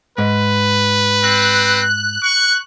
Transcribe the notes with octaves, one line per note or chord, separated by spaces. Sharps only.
G#2 B4
C4 F#6
C#6